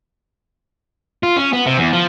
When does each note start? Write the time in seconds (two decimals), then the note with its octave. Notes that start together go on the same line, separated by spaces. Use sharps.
1.23 F4
1.36 C#4
1.53 B3
1.66 C3
1.78 E2
1.93 F3